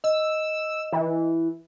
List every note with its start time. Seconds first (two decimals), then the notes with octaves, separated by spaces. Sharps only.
0.04 D#5 E6
0.92 E3